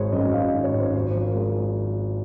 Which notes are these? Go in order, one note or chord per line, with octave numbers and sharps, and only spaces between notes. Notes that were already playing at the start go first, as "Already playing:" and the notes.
Already playing: G#1 G#3 C5 C#5
F#2 D#5
G#1 F5
D#3 D#5
C#5
G#1
C5
D#2 C5
F3
A#4
G#3